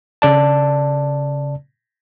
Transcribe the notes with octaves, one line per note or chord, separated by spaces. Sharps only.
C#3 D5 A5